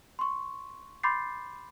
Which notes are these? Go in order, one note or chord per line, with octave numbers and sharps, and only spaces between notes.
C6 C#6
B5 C6 D6 G6 A6 C7